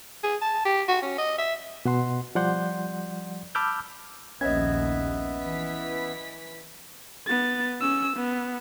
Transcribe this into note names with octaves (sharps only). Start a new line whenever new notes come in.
G#4
A5
G4
F#4
C#4
D#5
E5
B2 F#5 C6
F3 G3 D5 F#5 C6 G6
A5 B5 D6 E6 F6 G6
A#1 D#2 B3 C#4 B4 D#5 E5 G#6
E3 B6
B3 A6
C#4 E6
B3